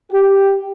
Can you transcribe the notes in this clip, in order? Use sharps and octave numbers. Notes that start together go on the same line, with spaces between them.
G4